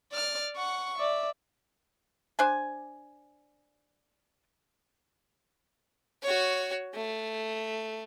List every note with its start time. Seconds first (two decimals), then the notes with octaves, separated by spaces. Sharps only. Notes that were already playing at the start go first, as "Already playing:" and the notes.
0.12 D5 F6
0.57 F#5 C#6
0.99 D5 E5
2.39 D4 C5 G#5
6.23 F#4 C#5
6.94 A3